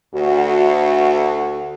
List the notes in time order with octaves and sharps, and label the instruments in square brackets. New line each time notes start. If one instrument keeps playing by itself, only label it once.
[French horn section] D2 F#4